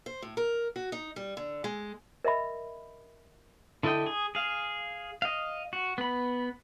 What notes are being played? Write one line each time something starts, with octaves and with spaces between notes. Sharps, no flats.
C5
A2
A#4
F#4
D#4
G3
D3
G#3
A#4 D#5 E5 B5
D3 E4 A4 D#5 G5
G#4
G#4 F5
D#5 F5
F#4
B3 B5